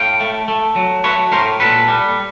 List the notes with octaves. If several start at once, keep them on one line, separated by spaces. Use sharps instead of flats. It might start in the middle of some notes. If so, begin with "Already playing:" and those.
Already playing: A2 F5 G5
A3
A3
F#3
A3 B4 C#5
A2 A#4 C5
A#2 A4 B4
G3